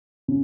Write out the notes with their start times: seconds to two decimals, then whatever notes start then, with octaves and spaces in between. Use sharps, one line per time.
0.28 C#3